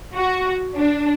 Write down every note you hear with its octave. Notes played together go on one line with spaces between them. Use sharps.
F#4
D4